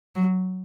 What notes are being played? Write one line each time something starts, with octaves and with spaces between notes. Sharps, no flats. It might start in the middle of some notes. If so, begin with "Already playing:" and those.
F#3